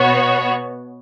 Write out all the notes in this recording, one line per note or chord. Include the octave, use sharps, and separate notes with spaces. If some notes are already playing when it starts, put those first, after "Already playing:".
Already playing: B2 B3 F#4 C#5